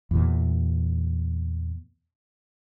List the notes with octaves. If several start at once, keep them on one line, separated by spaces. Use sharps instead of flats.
E2 A#2 E3